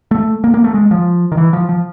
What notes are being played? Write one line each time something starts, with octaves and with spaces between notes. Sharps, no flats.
A3
A#3
A#3
A3
G#3
F3
D#3
E3
F3
F3